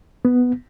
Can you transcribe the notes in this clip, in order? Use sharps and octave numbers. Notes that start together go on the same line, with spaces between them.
B3